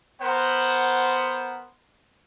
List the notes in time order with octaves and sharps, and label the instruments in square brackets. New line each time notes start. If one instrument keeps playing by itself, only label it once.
[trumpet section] B3 A#4 C5 F#5